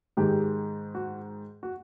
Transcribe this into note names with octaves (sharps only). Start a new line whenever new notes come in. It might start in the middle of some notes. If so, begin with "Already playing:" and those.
G#2 D#3 G#3 G4
F#4
F#4